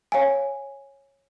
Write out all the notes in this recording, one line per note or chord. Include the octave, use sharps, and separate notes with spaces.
C#5 F5 G#5